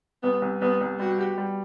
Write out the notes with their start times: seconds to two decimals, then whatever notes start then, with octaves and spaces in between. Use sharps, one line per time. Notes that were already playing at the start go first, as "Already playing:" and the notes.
0.23 C2 B3
0.42 C2
0.61 C2 B3
0.81 C2
0.99 G3 F#4
1.18 G4
1.38 G3